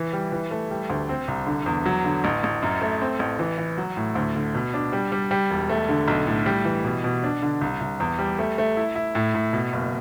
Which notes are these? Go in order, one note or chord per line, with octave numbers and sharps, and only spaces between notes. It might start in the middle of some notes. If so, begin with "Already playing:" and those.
Already playing: E3
G3
E3
A3
G3
D2
C4
C2
D3
E2
F#3
D3
A1
A1
F#2
A3
C4
A1
E3
E3
F#3
A2
D2
D3
B2
D4
G3
G3
G3
E1
A3
D3
B1
A2
G3
E3
B2
B2
D4
D3
C2
C2
E2
G3
A3
A3
E4
E4
A2
A2
B2
F#1